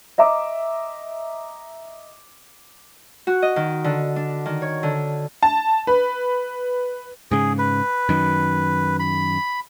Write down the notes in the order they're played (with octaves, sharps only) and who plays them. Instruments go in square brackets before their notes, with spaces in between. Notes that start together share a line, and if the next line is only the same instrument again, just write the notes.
[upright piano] D#5 E5 A#5 D6
[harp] F#4
D#5
D#3
D3
D4
D#3
C#5
D3
[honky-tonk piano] A5
B4
[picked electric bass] G#2 C#3 [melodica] G#4
[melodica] B4
[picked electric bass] F#2 D#3
[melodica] B5